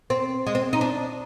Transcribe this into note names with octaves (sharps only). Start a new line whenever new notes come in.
C4
G#3
C4
D#4
D4